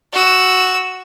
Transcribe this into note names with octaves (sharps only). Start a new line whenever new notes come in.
F#4 E6